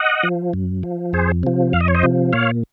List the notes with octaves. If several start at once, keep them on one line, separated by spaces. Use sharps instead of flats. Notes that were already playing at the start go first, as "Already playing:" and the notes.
Already playing: D#5 F#5
F3
F#2
F3
F2 G#4 C5
C3 F3
F2 F5
D#5
C#5
C5 D#5
C3 F3
A#2 C#5 F5